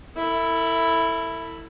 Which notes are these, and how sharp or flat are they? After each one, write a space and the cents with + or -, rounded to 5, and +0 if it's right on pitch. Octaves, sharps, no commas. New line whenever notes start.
E4 +0 A4 +40